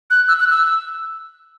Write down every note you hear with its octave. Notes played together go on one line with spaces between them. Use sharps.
F#6
E6
F#6
E6